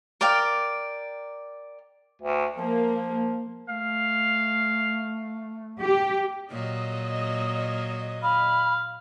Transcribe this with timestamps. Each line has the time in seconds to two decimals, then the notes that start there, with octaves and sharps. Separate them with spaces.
0.21 A#4 D5 F5 G5
2.22 D2
2.57 F3 A#3
3.69 A3 F5
5.80 G4
6.51 A#2 F#3 D#5
8.23 F5 B5